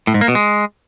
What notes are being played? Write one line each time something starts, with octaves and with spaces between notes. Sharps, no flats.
A2
G#2
A#3
B2
G#3